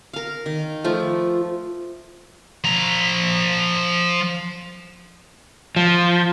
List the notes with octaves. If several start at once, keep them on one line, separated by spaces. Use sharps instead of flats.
A#4 F5
D#3
F3 A3 F4
F3 A#5
F3